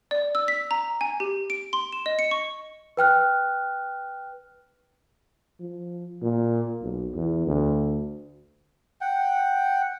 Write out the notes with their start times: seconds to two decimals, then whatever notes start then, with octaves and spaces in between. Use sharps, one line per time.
0.11 D5
0.35 E6
0.48 B6
0.71 A#5
1.01 G#5
1.20 G4
1.50 D7
1.73 C6
1.92 E7
2.06 D#5
2.19 C#7
2.31 C#6
2.97 B4 G5 F6 F#6
5.60 F3
6.22 A#2
6.82 B1
7.15 E2
7.47 D2
9.01 F#5 G5